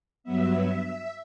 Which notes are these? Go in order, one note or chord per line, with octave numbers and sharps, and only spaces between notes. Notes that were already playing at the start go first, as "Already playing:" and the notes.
G2 F#3 B3 E5